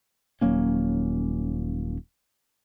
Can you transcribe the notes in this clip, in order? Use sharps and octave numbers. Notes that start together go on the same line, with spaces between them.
D#1 F#3 A#3 C#4